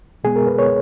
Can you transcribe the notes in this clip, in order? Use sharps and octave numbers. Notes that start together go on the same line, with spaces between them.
B2 G#3 B3 G#4
A#4
B4
C#5